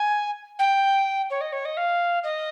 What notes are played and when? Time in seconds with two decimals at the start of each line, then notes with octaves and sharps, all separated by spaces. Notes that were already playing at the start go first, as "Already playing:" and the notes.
Already playing: G#5
0.59 G5
1.30 C#5
1.41 D#5
1.52 C#5
1.65 D#5
1.77 F5
2.24 D#5